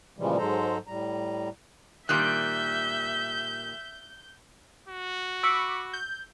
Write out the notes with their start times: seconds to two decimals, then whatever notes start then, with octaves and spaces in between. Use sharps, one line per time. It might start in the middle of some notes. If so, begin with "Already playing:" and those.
0.18 A#2 C#3 E3 F3 G3 G#3
0.38 G#2 F#3 G#3 A4 C5 A#5
0.87 A2 G3 A#5
2.09 A#2 D#3 G3 E5 F#6 G6
4.88 F#4
5.43 B5 C#6 D6 E6
5.93 G6